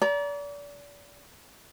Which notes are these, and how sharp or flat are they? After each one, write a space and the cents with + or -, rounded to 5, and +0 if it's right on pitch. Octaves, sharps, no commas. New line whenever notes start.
D5 -35 A#5 +20